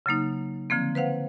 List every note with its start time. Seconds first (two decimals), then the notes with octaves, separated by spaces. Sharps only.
0.06 C#3 F#3 A#3 D#4
0.70 D3 F3 A#3 C4
0.95 B4 C5 F5 F#5